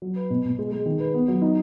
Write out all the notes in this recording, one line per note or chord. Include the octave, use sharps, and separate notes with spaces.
F#3
B4
B2
B2
G#3
G#3
D#3
B4
B3
F#3
D#4